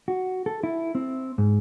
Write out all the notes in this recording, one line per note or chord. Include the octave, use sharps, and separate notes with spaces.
F#4
A4
E4
C4
G#2